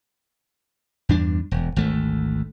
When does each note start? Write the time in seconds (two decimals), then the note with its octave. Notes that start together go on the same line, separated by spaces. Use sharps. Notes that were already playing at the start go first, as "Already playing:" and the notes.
1.09 E2 G2 D4
1.51 E1
1.76 G#1 D2 A3